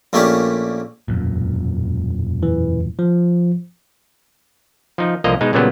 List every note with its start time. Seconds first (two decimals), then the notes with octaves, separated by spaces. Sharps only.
0.13 A#1 A3 A#3 C#4 G4 D5
1.08 E1 F#2 A#2
2.43 E3
2.99 F3
4.98 F3 D#4
5.24 C2 D3 F3 A#3 D#5 A#5
5.41 B2 G#3 D#4
5.53 A#2 C#3 F#3 G3 B3